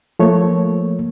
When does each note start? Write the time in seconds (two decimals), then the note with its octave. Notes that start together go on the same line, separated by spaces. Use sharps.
0.19 F3 A3 A#3 C#5